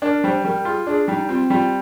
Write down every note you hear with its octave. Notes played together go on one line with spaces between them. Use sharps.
D4 A#4
G3 C5
G3 A#4
F4 G#4
D4 G#4
G3 D#4
C4 F4
G3 F4